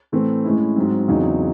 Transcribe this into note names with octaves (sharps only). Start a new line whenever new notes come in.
A2 E3 A3 C4
A2 G#3 C#4 E4
G#2 F#3 C4
E2 C#3 F#3 C4 D#4